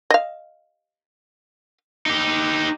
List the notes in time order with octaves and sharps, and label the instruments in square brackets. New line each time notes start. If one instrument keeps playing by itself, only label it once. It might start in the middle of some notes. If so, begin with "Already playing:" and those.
[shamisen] D#5 F5
[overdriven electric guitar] D#4 G4